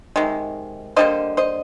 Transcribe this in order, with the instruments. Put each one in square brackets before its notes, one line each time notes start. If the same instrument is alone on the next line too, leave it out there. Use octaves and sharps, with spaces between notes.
[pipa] C3 D#3 G#3
D3 G3 A#3 C5 D#5
C5 D#5